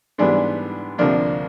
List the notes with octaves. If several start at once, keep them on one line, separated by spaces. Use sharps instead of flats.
G#2 E3 G3 B3 D4
D2 C3 F3 A#3 D4